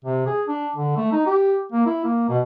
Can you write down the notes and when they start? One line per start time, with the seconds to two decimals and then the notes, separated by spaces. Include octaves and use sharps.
0.05 C3
0.27 G#4
0.47 D4
0.76 D3
0.97 A3
1.12 D#4
1.27 G4
1.72 A#3
1.86 E4
2.05 A#3
2.29 B2